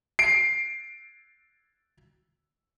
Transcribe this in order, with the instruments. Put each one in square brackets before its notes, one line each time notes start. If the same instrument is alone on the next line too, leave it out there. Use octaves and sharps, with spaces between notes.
[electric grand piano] C7 D7